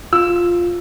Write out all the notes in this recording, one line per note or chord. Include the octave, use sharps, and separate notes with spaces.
F4 E6